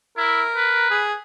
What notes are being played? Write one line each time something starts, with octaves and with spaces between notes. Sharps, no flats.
E4 A#4
B4
G#4